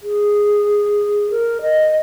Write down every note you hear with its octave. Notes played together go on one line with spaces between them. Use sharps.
G#4
A#4
D#5